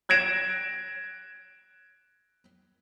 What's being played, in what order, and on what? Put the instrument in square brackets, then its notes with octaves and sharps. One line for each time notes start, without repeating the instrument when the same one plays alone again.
[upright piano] F#6 G#6 A#6 D7 E7